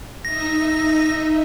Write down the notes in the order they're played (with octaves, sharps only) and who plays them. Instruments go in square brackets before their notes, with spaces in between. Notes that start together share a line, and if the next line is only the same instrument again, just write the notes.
[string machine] D#4 D#5 E5 [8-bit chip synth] A#6